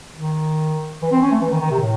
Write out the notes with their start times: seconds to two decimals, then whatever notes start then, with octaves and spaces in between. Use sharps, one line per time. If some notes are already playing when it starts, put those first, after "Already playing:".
0.14 D#3
1.02 E3
1.12 C4
1.22 C#4
1.31 A3
1.41 E3
1.51 D#3
1.61 D#3
1.71 C3
1.81 A2